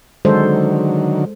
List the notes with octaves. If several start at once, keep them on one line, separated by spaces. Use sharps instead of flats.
D3 D#3 F#3 G#3 A4 C5